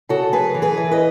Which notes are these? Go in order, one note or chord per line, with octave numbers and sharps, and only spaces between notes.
C#3 F#4 A4
F#2 G#4 B4
E3
G#4 B4
E3
B4 D#5